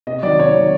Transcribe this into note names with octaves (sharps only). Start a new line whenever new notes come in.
C3 D#5
D#3 F#3 D5
C3 C#5
D#3 F#3